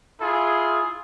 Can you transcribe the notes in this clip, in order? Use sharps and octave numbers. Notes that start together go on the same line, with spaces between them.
E4 F4 G#4